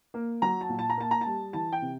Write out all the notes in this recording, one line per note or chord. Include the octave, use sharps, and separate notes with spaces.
A#3
F#3 A#5
A5
A#2
A5
A#5
A#3 A5
A#5
A5
G3
E3 A5
G5
C3